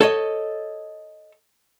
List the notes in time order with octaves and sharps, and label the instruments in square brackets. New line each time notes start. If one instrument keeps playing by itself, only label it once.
[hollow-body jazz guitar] A4 C#5 D#5